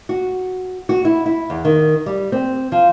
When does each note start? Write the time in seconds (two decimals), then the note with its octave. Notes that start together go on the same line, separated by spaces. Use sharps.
0.09 F#4
0.89 F#4
1.05 E4
1.26 E4
1.50 E2
1.65 D#3
2.06 G3
2.32 C4
2.72 F3